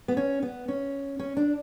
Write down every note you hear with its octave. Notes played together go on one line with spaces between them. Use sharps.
B3
C#4
B3
C#4
C#4
D4